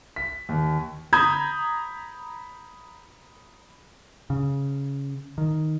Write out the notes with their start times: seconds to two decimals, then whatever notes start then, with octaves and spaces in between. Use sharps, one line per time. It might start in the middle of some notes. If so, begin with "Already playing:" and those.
0.16 B6
0.49 D#2
1.13 A#5 B5 D#6 G6 G#6
4.30 C#3
5.38 D#3